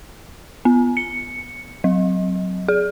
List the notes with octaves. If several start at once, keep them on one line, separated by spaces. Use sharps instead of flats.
B3
C#7
F#3
G#4